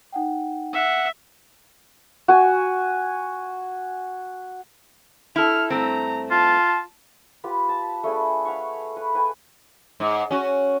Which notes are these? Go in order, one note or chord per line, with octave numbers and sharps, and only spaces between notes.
D#4 F#5 G5
E5 F#5
F#4 G#5
E4 A4 F6
G2 A3 C4 A#5
F4 A5
F4 G4 B4
A5
A3 D4 G#4 B4
F5 F#5 B5 C#6
B4
B4 G#5
G#2
C#4 F#4